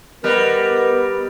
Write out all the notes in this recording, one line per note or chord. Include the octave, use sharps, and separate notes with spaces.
G3 B3 A#4 B4 D#5